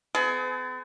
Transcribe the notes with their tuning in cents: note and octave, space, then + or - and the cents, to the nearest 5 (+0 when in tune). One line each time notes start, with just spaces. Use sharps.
B3 +45 G#4 +40